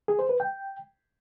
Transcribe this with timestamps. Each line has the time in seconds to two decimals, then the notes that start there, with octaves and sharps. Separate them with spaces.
0.08 G#4
0.19 C5
0.29 B4
0.40 G5